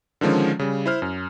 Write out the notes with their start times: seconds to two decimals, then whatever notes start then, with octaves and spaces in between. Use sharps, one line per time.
0.21 D3 D#3 F3 G#3 C#4
0.59 C#3 G3
0.86 E4 C5 F6
1.02 F#2